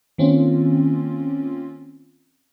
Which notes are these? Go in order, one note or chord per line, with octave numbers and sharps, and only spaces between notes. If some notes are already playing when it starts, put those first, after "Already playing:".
D#3 A#3 C4 C#4 F4